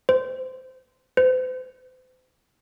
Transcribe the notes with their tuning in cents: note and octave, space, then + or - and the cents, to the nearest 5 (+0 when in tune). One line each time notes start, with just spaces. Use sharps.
C5 -20
C5 -40